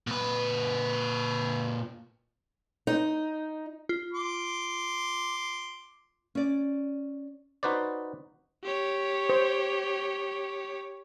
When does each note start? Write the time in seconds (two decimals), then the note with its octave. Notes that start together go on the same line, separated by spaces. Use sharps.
0.07 A#2 B4
2.87 D#4
3.89 F4
4.13 C6 D6
6.35 C#4 D5
7.63 D#4 F#4 B4 C5 D5
8.64 G4 C#5
9.29 C5